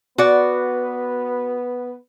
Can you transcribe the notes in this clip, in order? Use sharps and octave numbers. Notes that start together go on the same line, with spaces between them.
B3 F#4 B4 D5